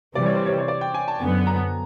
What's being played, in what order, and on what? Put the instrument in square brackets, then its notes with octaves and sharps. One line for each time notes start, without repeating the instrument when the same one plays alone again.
[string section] C3 E3 G3 [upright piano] D5
[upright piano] C#5
C5
C#5
C#5
D5
G5
G#5
A5
[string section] F#2 D3 F#3 B3 [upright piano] G#5
[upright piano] A#5